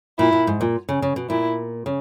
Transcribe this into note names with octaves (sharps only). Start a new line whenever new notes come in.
A#2 E4
A#2
G#2
A#2
C#3
C#3
B2
A#2 E4
C#3